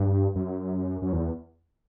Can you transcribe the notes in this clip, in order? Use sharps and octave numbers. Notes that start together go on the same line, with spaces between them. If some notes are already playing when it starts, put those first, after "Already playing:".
Already playing: G2
F#2
F#2
E2